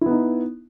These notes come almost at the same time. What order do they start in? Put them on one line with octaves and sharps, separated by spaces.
E4 B3 D#4